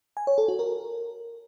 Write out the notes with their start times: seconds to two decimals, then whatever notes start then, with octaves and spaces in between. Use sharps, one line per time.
0.17 G#5
0.27 C#5
0.38 A4
0.48 F#4
0.59 A#4